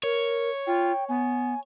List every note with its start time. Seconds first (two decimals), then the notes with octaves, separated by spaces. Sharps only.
0.04 A#4 C#5
0.67 F4 G5
1.09 B3 G#5